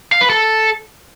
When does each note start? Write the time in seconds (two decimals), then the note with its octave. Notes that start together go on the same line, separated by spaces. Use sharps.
0.12 F5
0.21 B4
0.30 A4